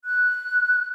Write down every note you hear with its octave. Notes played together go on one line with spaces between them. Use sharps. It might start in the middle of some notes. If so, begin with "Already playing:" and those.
F#6